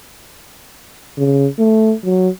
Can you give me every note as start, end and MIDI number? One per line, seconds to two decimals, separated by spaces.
1.18 1.47 49
1.59 1.94 57
2.05 2.29 54